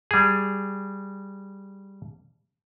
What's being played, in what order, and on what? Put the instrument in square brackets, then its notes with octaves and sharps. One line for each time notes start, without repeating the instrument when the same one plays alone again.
[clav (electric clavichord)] G3 G#4